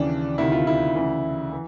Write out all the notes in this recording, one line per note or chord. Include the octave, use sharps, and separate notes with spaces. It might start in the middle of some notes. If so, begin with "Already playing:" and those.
Already playing: D#2 C#3 E3 D4
D2 C3 D#3 E4
F4
E4
D2 C#3 E3
E3